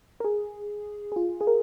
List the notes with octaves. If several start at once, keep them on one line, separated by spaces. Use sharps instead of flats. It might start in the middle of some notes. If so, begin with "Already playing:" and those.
A#4
G#4
G#4
F4
G#4
A#4